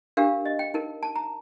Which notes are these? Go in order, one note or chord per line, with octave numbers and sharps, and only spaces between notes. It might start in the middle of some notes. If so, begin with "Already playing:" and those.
D4 G4 A#4 F5
D#5
G5
D#4 A#4
A5
A#5